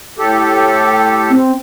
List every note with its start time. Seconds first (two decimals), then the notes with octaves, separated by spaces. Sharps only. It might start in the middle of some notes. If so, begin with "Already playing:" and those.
0.18 A2 G4 A4
1.30 C4